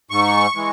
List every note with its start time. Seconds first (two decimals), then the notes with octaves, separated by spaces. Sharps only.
0.11 G#2 C#6
0.55 E3 G#3